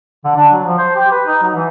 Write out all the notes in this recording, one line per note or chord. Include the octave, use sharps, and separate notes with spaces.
D3
D4
F#3
F3
C5
G4
B4
D#4
F#3
E3